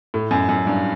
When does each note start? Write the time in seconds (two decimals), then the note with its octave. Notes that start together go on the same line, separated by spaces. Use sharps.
0.14 A2
0.31 F#2
0.49 F#2
0.67 G2